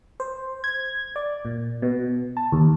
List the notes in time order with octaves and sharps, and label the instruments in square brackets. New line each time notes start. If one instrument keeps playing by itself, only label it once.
[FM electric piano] C5
G#6
D5
A#2
B2
A5
D#2